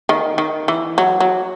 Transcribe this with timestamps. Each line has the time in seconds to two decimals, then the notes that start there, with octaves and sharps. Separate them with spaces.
0.09 D#3
0.38 D#3
0.68 E3
0.98 F#3
1.20 F#3